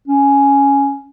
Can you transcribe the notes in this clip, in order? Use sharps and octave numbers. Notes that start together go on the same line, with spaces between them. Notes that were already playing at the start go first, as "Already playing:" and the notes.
C#4